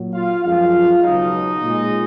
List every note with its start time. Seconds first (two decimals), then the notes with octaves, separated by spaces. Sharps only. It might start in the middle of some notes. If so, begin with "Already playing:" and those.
Already playing: A#2 F#3
0.14 F4 F5
0.43 F#2 F3 G#3 F4 F5
1.03 C#2 B2 F#3 D#4 D#5
1.63 A#2 G#3